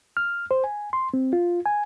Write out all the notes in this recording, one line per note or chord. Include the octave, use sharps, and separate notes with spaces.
F6
C5
G#5
C6
C4
F4
G#5